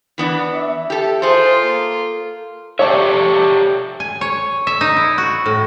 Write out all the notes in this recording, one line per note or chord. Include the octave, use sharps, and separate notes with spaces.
E3 B3 D4
E5
G4 A4 E5
F4 G#4 A4 C5
A#3
G4 A4 C#5 D5 E5 C#6
G#5
C#5
E5
D#4
E4
F#4
A2